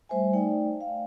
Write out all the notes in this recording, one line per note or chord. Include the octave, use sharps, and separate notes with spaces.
G3 A3 C5 E5 G#5
A3 D#4 D5 G5
F5